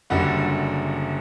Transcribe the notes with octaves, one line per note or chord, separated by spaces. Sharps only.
F#1 F#2 D3 G3 F#5